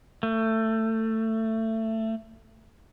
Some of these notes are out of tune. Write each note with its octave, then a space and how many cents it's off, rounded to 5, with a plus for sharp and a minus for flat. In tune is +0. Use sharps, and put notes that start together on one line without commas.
A3 +20